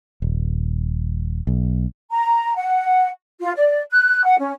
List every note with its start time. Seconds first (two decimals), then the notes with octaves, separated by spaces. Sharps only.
0.22 D#1
1.47 B1
2.11 A#5
2.56 F#5
3.40 F4
3.55 D5
3.91 F#6
4.24 F#5
4.38 C#4